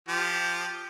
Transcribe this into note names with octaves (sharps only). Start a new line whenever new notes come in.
F3 G4